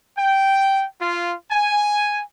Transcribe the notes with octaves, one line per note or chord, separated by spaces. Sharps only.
G5
F4
G#5